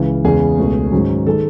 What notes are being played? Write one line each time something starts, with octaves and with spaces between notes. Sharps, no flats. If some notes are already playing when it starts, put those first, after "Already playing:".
Already playing: C#2 C#3 E3
E2 C#3 G#3 B3 G#4
C#2 B2 A3 C#4
G#2 D#3 F#3 C#4
D#3 G#3 A4